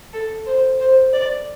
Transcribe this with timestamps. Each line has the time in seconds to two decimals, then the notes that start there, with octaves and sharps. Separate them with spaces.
0.13 A4
0.46 C5
0.80 C5
1.13 D5